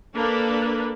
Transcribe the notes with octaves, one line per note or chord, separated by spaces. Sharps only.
A#3 D4 A4 B4